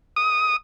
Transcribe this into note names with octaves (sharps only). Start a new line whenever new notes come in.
D#6